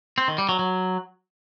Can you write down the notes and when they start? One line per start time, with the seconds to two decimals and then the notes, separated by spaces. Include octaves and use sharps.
0.18 C4
0.28 D#3
0.38 G3
0.49 F#3
0.59 F#3